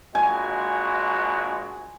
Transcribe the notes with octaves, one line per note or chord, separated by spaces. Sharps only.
A#1 G#3 F#4 G#5